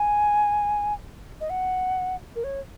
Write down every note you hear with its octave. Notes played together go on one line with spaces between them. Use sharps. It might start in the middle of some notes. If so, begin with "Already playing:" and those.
Already playing: G#5
D#5
F#5
A#4
C#5